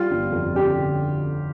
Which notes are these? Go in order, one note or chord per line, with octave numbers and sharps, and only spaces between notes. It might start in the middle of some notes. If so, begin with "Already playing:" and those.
Already playing: G3 F4
G1
F2
D3 G4
D3